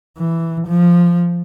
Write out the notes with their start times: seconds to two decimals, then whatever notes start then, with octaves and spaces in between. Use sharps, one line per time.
0.18 E3
0.67 F3